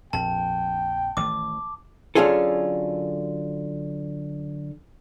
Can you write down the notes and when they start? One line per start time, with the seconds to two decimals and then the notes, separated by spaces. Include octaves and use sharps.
0.13 A#1 F2 G5 A5
1.17 A1 D#3 A3 D6
2.15 D3 F#3 C#4 F4 G#4 A4